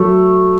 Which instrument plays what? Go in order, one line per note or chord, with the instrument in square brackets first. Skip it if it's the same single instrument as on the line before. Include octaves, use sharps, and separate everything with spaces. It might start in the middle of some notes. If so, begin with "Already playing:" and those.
Already playing: [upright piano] F#3 [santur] A3